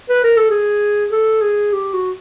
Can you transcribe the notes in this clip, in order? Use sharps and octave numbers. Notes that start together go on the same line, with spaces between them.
B4
A#4
A4
G#4
A4
G#4
G4
F#4